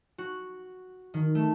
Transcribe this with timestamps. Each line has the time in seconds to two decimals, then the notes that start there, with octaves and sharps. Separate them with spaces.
0.18 F#4
1.14 D#3
1.35 A3